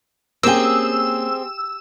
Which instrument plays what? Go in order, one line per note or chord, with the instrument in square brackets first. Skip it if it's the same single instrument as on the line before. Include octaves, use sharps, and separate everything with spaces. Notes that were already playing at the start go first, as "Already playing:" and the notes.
[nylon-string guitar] A#3 C#4 [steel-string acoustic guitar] C4 G#4 [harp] G4 G5 [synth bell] E6